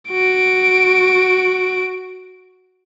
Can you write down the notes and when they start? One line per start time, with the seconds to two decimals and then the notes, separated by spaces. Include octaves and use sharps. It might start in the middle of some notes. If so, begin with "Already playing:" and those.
0.11 F#4 D7